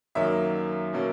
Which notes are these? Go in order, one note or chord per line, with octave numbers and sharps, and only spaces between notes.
F#2 D#3 F#3 A#3 D#4 E5
B2 F#3 A#3 C#4